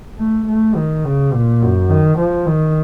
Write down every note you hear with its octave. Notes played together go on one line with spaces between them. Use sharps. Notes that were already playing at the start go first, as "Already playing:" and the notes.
A3
A3
D#3
C#3
A#2
F#2
D#3
F3
D#3